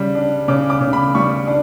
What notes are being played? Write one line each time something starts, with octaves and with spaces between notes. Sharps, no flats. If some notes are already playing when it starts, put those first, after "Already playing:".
Already playing: C#3 G3
D4
C#3 D6
D6
C#3
B5
G3 C#6
D4